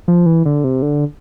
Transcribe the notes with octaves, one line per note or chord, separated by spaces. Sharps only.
F3
E3
D3
C3
D3